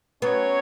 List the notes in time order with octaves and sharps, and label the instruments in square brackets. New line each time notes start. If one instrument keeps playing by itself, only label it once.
[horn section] F#3 C#4 F#4 C#5 [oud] B3